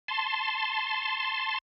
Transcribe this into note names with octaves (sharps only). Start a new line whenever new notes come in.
A5 C6